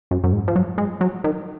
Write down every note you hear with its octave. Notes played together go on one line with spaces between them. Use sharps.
F#2
F#2
G#2
F3
F#3
G#3
F#3
D#3